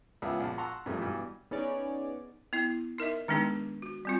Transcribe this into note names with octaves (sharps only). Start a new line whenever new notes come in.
C#2 B3 F4 G#4 E5 A5
A#1 A5
F#5 A5 A#5 C6 C#6 E6
G2 C3 F3 G#3 A3
G2 B2 E3
B3 C#4 D#4 G#4 C#5 D5
B3 E4
D#4 A#4 D#5 E5
D#3 G#3 B3 D4 D#4 G#4
F#4
G3 C4 F4